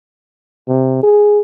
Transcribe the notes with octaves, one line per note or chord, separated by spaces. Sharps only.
C3
G#4